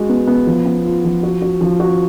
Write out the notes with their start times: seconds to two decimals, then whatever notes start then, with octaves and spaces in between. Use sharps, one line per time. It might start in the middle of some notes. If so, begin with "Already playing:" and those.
Already playing: G#3 F#4
0.09 B3
0.27 B3
0.47 F3
0.65 B3
0.85 F4
1.05 F3
1.23 F#4
1.42 F#4
1.61 F3
1.80 F#4